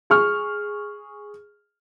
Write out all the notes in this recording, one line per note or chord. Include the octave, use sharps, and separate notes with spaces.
G#4 C#6 F6